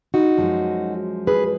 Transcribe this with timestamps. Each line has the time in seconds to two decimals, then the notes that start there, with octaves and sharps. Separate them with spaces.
0.14 D#4 F#4
0.38 F#2 F3 G#3
1.27 G#4 B4